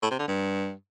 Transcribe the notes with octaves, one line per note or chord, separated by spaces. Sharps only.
A2
C3
D3
G2